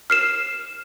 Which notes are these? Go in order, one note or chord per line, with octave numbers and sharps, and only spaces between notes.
F6 C7 E7